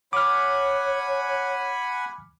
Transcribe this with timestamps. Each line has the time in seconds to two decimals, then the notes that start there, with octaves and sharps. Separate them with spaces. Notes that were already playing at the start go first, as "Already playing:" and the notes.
0.13 C#5 F#5 G#5 B5 D6 F6